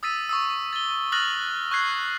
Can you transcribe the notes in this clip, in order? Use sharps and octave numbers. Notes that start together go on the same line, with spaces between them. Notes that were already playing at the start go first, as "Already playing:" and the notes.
D#6 E6 A6 B6 D#7
C#6 D#6 E6
A6 G7
D#6 F6 F#6 A6 A#6 F#7
C#6 F#6 G#6 C7